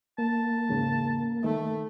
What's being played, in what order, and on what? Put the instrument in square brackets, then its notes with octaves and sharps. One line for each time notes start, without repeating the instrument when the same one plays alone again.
[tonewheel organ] A#3 [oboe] A5
[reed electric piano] E2 G#2 C#3
[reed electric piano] D#3 [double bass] A3